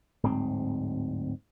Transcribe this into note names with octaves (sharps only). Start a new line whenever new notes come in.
D1 G#2 C4